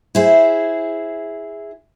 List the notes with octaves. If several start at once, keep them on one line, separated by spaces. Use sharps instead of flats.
E4 G#4 C5